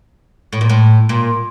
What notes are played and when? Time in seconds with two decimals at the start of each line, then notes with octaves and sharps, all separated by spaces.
0.53 A2
0.61 A#2
0.70 A2
1.09 A#2